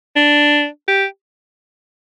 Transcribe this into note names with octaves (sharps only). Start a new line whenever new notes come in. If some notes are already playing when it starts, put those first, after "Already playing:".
D4
G4